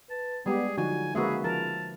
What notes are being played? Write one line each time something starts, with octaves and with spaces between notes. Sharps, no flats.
B4 A5
G3 G#3 B3 G4 G#4
D3 F3 F#3 D#4 F#4 G#5
C#3 G#3 A#3 F#4 G#4 B4 E5
F3 A#4 A5